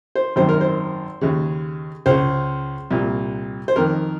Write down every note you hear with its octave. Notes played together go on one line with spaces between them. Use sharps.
C5
G#1 F#2 D#3 C5
A#4
C5
D#2 C#3
C#2 C#3 C5
C2 A#2
C5
F2 D#3 A#4